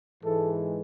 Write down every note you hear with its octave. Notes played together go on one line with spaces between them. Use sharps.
G#2 E3 G#3 A4